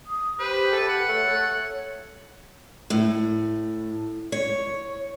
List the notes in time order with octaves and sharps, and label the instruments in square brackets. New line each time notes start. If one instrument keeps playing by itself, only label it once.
[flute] D#6
[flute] G4 [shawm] B4 [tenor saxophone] C5
[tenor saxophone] A4
[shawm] F#5
[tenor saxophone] A3 [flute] C#5
[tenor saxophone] A3
[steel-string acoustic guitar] A2
C#5